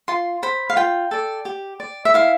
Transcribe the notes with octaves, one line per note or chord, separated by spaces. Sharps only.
F4 C6
C5 B5
F5
F4 G5
A4 D5
G4
D5
E5
E4 F5